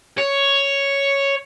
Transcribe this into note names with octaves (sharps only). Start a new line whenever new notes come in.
C#5